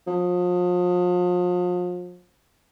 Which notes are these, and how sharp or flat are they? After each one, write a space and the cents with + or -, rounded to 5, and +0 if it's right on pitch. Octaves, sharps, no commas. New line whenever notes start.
F3 +35